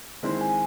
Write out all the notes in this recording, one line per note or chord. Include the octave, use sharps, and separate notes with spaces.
D#3 G#3 C4 E4 C5
G#5